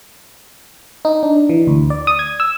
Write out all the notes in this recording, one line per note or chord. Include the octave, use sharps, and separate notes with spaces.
D#4
D4
E3
D2
D5
D#6
G#6
E6